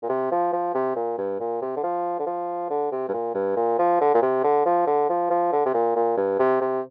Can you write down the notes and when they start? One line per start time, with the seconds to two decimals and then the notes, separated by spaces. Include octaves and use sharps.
0.03 A#2
0.09 C3
0.31 F3
0.53 F3
0.75 C3
0.96 A#2
1.18 G2
1.40 A#2
1.62 C3
1.76 D3
1.83 F3
2.19 D3
2.26 F3
2.70 D3
2.92 C3
3.09 G2
3.13 A#2
3.35 G2
3.56 A#2
3.78 F3
4.01 D3
4.14 A#2
4.22 C3
4.44 D3
4.66 F3
4.87 D3
5.09 F3
5.30 F3
5.52 D3
5.66 C3
5.74 A#2
5.96 A#2
6.17 G2
6.39 C3
6.61 C3